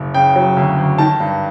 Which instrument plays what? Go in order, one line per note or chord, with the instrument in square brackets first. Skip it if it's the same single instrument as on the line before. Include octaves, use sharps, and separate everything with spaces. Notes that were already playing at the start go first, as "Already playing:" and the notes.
Already playing: [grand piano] F#1
C#3 G5
F#3
D2
D2
D#3 A5
G2